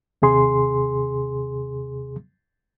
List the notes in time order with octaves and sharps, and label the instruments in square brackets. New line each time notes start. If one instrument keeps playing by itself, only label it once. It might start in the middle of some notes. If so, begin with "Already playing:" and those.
[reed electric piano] D#2 C3 G#4 C6